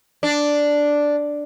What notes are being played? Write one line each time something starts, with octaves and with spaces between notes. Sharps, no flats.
D4